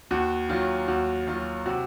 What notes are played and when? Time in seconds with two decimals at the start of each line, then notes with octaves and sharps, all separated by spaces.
0.11 D#2 F#4
0.49 D#3 F#3 F4
0.88 D#2 F#4
1.27 D#3 F#3 F4
1.66 C3 F#4